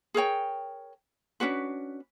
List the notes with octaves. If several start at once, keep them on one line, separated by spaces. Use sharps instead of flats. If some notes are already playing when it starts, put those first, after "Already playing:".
G#4 A#4 C#5 G5
C#4 D4 F#4 B4